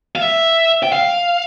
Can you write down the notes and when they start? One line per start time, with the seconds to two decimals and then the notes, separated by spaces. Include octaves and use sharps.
0.15 F5
0.21 E5
0.83 G5
0.93 F5